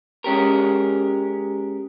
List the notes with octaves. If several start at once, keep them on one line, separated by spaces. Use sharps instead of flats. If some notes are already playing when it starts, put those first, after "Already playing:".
G#3 C#4 G4 A#4